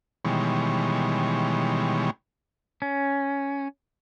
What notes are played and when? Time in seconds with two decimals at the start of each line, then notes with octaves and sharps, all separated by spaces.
0.25 B2 D#3 E3 G3 G#3 C#5
2.82 C#4